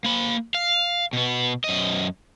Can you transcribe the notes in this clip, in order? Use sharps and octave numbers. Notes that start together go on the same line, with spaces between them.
A#3 B5
F5
B2 B3
F#2 D#5